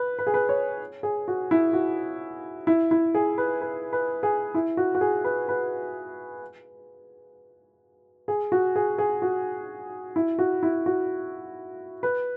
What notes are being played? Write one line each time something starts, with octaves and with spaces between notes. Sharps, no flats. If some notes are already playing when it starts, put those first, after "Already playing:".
Already playing: B4
B4
G#4
B4
C#5
G#4
F#4
E4
F#4
E4
E4
G#4
B4
B4
B4
G#4
E4
F#4
F#4
G#4
B4
B4
G#4
F#4
G#4
G#4
F#4
E4
F#4
E4
F#4
B4